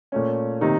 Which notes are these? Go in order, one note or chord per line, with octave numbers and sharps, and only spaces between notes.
A#2 A3 C#4
C3 D#3 A#3 D#4